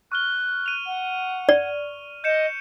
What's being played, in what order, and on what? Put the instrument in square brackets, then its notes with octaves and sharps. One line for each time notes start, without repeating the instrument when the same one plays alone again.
[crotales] C#6 F6 G7 [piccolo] F#6
[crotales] D#7 F7
[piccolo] F#5
[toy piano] D5
[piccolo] D#5 [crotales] G6 C#7 E7